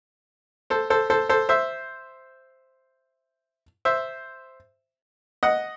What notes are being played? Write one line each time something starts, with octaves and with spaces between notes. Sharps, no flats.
A4 C5
A4 C5
A4 C5
A4 C5
C5 E5
C5 E5
D#5 F#5